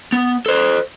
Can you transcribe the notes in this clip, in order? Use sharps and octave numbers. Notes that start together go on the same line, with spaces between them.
B3
A4 C5